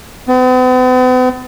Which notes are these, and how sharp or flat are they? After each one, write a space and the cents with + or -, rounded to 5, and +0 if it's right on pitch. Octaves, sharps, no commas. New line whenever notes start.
B3 +45